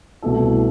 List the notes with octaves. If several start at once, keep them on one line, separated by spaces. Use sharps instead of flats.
C2 B2 A3 E4 A4